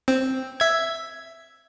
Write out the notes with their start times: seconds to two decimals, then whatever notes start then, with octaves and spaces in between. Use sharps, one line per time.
0.08 C4
0.60 E5 G#6